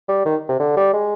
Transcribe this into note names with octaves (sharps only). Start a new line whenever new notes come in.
G3
D#3
C3
D3
G3
G#3